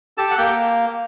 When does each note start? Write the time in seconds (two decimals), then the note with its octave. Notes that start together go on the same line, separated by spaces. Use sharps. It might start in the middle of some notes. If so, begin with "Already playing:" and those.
0.18 G4 A4 A5
0.31 F#5
0.37 A#3 G4 G5